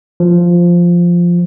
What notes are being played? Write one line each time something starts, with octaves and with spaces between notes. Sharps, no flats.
F3